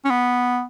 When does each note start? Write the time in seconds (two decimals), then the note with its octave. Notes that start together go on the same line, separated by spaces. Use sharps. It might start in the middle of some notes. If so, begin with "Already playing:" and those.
0.05 C#4
0.10 B3